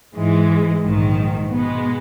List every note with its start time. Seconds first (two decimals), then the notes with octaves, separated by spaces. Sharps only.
0.14 G#2 E3 G#3
0.82 A#1 G#2 D#3
1.49 B2 G#3 B3